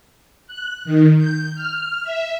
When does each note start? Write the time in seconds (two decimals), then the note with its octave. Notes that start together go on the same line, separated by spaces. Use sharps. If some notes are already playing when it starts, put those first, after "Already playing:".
0.47 F#6
0.85 D#3
1.17 G6
1.55 F6
2.03 E5